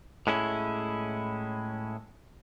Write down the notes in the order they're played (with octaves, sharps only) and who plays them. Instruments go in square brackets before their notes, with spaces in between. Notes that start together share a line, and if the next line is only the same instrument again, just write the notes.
[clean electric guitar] A2 G#3 C#4 E4